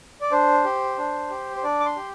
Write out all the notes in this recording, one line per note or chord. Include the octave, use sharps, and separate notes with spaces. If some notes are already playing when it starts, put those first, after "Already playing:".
D5
D4 C5
G4
D4
G4
C5
D4 D5
D6
C6
G4